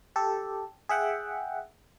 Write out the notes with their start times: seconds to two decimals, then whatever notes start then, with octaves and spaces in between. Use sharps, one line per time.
0.16 G4 A4
0.89 G#4 E5 F#5 G5